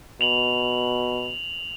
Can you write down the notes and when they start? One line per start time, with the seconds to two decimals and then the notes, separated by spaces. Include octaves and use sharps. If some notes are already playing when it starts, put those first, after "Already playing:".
0.21 B2 F7 F#7